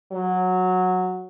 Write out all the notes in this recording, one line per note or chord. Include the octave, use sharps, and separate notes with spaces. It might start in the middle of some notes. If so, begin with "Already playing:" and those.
F#3